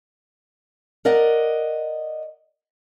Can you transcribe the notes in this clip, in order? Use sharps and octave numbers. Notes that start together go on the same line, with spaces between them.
A#4 D5 D#5 F#5